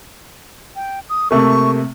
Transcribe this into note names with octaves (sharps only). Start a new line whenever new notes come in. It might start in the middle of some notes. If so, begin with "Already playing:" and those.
G5
D#6
C3 A3 A#3 C#6